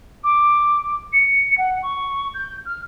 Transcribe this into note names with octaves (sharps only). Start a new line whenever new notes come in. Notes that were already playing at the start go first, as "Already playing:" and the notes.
D6
C#7
F#5
C#6
G6
F6